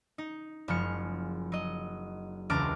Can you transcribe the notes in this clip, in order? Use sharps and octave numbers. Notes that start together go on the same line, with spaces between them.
D#4
F#1 F3 G#3 F6 C#7
F#3 D#5
E1 C#2 A#4 A5 D6 F6